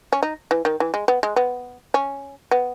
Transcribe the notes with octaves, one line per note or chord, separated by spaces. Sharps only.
C#4
D#4
E3
D#3
E3
G#3
B3
G#3
B3
C#4
B3